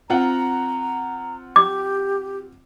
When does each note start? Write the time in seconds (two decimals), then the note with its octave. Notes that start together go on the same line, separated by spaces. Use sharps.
0.10 C4 F4 F#5 A#5
1.56 G4 D6